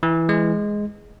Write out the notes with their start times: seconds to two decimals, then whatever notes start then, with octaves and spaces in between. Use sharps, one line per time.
0.03 E3
0.29 G#3